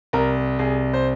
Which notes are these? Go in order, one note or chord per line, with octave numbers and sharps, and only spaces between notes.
C2 A#4
C2 G#4
C5